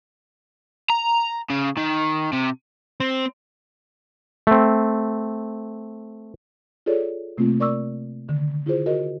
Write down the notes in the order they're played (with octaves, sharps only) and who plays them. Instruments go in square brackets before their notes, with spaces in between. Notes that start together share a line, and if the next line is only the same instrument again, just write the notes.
[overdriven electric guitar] A#5
C#3
D#3
C3
[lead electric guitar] C4
[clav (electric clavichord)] A3 C4
[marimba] F4 G#4 A4 C#5 D5
C3 A3 A#3 C4 F4
A#4 D5 C#6 D6 E6
D3 D#3
E4 F4 G#4 C5
F#4 A#4 D#5